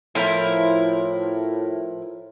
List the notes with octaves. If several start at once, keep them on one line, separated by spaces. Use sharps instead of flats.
A2 F3 E4 A#4